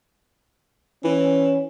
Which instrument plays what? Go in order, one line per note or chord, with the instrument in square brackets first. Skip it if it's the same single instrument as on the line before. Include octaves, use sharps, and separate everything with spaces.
[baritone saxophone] E3 [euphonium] C#4